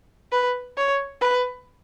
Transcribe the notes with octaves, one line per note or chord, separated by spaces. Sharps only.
B4
C#5
B4